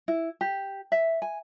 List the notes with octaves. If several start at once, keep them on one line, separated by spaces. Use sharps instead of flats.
E4
G4
E5
G#5